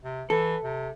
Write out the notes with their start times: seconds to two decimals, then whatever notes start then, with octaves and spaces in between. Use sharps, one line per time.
0.04 C3
0.30 E3 A4
0.64 C3